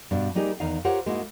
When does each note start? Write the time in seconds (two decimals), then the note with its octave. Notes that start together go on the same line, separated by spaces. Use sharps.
0.11 G2 B2 D4
0.35 G3 A#3 D#4 G4 G#4 D5
0.60 E2 D#3 D#4 F5
0.84 F4 G4 A#4 C5 C#5 F#5
1.06 G#2 G#3 A#3 D#4 E4 F#4